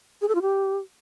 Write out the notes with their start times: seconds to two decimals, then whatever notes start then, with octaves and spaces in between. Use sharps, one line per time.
0.22 G#4
0.28 A4
0.35 F4
0.42 G4